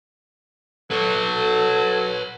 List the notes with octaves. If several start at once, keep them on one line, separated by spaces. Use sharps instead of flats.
F#3 A4 B4 C#5